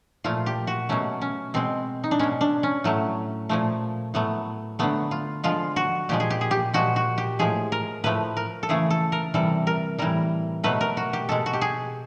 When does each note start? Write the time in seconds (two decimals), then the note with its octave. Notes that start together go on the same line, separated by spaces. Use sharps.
0.24 A#2 F3 A3 F4
0.46 G4
0.67 F#4
0.89 B2 F#3 A3 C#4
1.21 C#4
1.54 B2 G#3 C4
2.04 D#4
2.11 D4
2.19 B2 G#3 C#4
2.41 D4
2.63 C#4
2.84 A2 F#3 A3
3.49 A#2 F3 A3
4.14 A2 F#3 A3 B3
4.79 D3 F#3 A3 B3
5.11 F4
5.44 D3 F3 G#3 F4
5.76 F#4
6.09 A#2 F3 G#3 G4
6.20 G#4
6.30 G4
6.41 G#4
6.51 G4
6.73 A#2 F3 G#3 F#4
6.96 F#4
7.18 G4
7.39 A2 F3 G#3 G#4
7.72 A#4
8.04 A2 F3 A3 B4
8.37 A#4
8.63 A4
8.69 C#3 E3 A3 G#4
8.90 A4
9.12 A#4
9.34 C3 E3 G3 A4
9.67 A#4
9.98 A2 E3 G3 A#4
10.64 B2 F#3 A3 B4
10.81 A#4
10.97 F#4
11.13 G4
11.29 B2 G#3 A4
11.46 F#4
11.53 G4
11.61 G#4